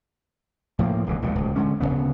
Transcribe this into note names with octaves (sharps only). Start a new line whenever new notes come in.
A2 F3 A3 A#3
D1 C#2 B2 E3
A#1 D#2 A#2 G#3
D1 C#2
D3 G#3 C#4
D1 F2 C#3 B3